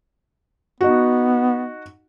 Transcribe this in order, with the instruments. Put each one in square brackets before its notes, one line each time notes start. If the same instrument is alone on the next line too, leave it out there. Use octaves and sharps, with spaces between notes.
[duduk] B3 [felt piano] D#4 F#4